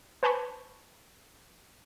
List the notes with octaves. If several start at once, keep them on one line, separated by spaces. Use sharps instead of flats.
B4 C5 G#5 A5 B5 C#6